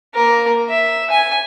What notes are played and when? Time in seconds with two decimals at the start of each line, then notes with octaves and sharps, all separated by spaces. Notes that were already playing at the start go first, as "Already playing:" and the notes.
0.15 A#3 A#4
0.69 E5
1.10 G#5